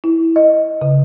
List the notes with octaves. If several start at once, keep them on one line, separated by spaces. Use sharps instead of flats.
E4
D#5
C#3